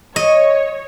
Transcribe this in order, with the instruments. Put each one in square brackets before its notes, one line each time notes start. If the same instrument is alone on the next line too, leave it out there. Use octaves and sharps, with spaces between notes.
[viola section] C#5 [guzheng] D#5